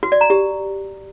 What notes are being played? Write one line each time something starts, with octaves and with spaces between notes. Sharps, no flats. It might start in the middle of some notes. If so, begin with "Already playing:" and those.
F#4
D5
A#5
G4